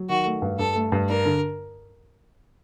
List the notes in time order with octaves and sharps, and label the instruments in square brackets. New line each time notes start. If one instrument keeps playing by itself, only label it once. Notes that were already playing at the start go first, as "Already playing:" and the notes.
Already playing: [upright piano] F#3
[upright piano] D#3 [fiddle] F#4
[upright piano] A3
G2
[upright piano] G2 [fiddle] A4
[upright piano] A3
G2
[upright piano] D4 [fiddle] A#4
[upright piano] D3